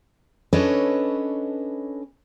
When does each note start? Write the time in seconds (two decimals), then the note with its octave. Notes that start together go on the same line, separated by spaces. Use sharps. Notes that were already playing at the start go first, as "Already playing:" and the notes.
0.53 C#4 D4 A4 B4 C#5 D#5